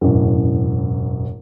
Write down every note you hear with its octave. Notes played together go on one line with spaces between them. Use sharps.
E1 A1 F#2